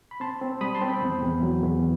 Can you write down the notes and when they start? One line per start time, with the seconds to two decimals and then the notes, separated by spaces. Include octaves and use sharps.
0.11 B5
0.20 C4 A5 C6
0.41 C4
0.61 G3 B5 D#6
0.75 A5 C6
0.82 C4
0.88 G5 B5
1.02 E2
1.23 E2
1.43 F#3
1.63 E2